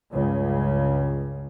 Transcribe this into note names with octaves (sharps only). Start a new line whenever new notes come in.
C#2 G2 C#3